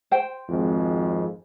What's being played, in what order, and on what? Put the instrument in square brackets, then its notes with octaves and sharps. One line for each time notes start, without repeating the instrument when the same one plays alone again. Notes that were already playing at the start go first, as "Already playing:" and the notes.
[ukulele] C5 G5
[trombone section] G#1 F2 G#3